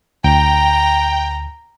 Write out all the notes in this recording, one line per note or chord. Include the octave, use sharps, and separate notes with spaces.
D2 G5 A#5